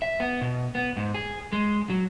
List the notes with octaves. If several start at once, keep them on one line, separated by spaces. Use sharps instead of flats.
E5
B3
B2
B3
G#2
G#4
G#3
F#3